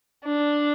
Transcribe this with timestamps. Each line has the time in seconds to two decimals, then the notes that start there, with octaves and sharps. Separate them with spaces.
0.25 D4